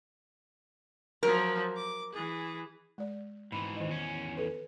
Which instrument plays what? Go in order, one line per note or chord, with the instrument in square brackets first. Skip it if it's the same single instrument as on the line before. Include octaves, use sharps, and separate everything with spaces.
[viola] F3 F#3 [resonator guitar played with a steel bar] A#4
[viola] D6
E3 G#4
[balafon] G#3 D5
[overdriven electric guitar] G#2 E3 [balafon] B5
[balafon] D#3 D#5
[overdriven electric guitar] E2 C#4
[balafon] A4 B4